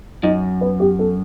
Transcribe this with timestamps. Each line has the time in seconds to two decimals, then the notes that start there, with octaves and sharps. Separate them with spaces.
0.23 F#2 D#4
0.61 B4
0.80 G4
0.99 A4